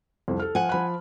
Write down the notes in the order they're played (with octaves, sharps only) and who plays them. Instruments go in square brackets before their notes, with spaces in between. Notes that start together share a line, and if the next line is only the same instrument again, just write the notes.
[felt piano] C2 F2
A4 F6
[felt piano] F3 [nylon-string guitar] F#5 G#5
[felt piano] F3 B5 F#6